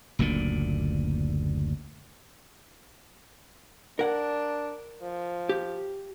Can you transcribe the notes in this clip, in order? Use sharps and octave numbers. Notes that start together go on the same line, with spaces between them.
F#1 D2 A#2 D3
D4 A#4 F#5
F3
G4